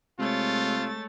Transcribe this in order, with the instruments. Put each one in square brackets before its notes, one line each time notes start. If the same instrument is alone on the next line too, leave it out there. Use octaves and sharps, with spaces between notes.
[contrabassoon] C3 [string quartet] G#3 C#5 A6 [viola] A3 [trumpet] F4